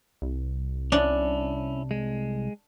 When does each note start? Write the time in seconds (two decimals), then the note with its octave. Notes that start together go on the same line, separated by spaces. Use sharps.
0.22 C2
0.92 C#4 D4 E4
1.91 G#3